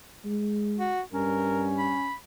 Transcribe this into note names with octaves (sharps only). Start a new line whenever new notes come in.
G#3
F#4
G2 C#4 A#4
B5